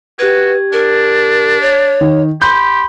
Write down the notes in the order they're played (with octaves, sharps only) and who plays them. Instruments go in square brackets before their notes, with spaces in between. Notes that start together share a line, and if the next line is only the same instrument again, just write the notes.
[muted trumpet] F#4 [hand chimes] G4 G#6 [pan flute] B4
[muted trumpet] D4 [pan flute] A#4
[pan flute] C#5
[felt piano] D#3
[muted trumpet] G4 [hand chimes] B5 [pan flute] C6 [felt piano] G6